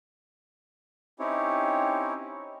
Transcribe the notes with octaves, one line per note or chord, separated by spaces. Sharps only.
C4 C#4 D#4 E4 G4 C#5